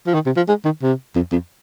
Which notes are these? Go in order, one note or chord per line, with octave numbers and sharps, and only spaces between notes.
F3
D#3
C3
F3
G#3
D#3
C3
F2
F2